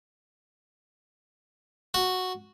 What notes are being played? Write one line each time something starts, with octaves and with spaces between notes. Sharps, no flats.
F#4